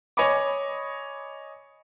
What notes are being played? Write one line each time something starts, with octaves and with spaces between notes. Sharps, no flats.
C#5 D#5 G#5 B5 C#6 D6